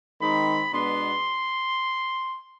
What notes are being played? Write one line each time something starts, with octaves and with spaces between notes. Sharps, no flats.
D#3 G#3 C4 D#4 B5
B2 G#3 B3 D4 C6